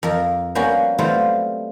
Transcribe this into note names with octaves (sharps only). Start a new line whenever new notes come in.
F2 A#4
G3 A#3 B3 C#4 F#4
F#3 G3 A3 B3 C4 F4